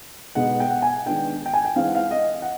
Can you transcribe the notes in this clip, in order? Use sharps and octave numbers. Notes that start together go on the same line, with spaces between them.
B2 G#3 B3 D#4 F#5
G5
F#5
G#5
D#3 G#3 B3 D4 G5
G5
G#5
G5
E3 G#3 C4 D#4 F5
F#5
F5
D#5
F#5